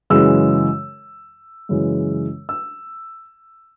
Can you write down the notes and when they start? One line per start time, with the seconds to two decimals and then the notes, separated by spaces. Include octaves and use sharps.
0.10 F#2 C#3 E3 G#3 E6
1.69 F#2 C#3 E3 G#3
2.49 E6